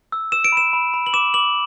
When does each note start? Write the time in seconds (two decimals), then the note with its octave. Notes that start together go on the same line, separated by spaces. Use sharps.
0.12 E6
0.32 E6 E7
0.44 D7
0.52 B5 E7
0.73 B5
0.94 B5
1.06 F#7
1.13 D6 E7
1.34 D6 F#7